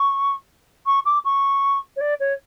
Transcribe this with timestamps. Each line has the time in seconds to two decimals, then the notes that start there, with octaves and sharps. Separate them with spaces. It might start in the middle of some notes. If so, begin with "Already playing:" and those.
Already playing: C#6
0.86 C#6
1.05 D6
1.25 C#6
1.96 C#5
2.01 D5
2.20 C#5